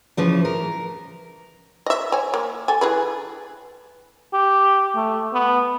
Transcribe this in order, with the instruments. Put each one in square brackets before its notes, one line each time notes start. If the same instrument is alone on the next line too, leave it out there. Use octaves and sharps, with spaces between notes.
[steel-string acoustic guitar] C#3 E3 F3
A#4
[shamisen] D#5 E5
C#5 G#5
A#3
A4 G#5
E3 G#4 B4
[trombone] G4
A3
B3